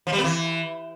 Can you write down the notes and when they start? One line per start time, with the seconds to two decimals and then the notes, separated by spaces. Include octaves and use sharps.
0.07 F3
0.13 G3
0.18 B3
0.24 E3